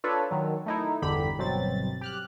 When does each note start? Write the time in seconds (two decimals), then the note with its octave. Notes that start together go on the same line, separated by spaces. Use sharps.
0.04 D4 F4 A4 B4 C#5
0.31 D#3 F#3
0.66 A3 D#4 E4
1.02 G1 E2 D3 G4 B5
1.38 G1 B2 F#3 C4 A6
2.01 G4 F6 F#6